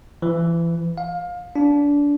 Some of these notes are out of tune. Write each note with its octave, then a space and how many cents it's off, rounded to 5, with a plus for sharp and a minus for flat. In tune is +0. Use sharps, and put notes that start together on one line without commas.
E3 +35
F5 +20
D4 -25